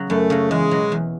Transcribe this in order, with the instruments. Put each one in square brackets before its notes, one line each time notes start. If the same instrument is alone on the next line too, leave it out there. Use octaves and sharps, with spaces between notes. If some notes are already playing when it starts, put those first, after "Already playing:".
Already playing: [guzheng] C#3 F#3
[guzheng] F#2 [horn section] A3
[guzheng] C#3 F#3
[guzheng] E2 [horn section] G#3
[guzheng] B2 F#3
E2